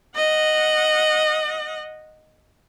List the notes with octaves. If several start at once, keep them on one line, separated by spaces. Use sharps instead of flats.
D#5 F#5